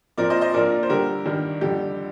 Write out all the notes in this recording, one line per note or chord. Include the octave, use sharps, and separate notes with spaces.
A#2 F3 C4 A#4 D5
C5 D#5
C5 D#5
A#2 F3 A#3 D4 A#4 D5
C5
D3 G3 D4 G4 A#4
G2 D#3 G3
F2 D3 G3 G4